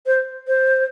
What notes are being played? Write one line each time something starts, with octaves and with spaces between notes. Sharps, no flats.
C5
C5